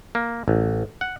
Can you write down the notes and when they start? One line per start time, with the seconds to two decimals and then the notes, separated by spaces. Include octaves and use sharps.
0.15 A#3
0.48 A1
1.01 F#5